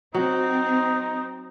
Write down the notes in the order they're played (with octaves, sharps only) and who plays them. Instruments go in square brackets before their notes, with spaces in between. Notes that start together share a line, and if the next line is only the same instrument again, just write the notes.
[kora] F#3 [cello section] C4 [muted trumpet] D#4